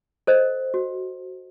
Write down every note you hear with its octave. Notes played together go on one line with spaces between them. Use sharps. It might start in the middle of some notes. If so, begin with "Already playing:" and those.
A4 C5 D#5
F#4